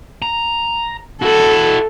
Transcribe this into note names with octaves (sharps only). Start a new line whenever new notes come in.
A#5
E4 F#4 A4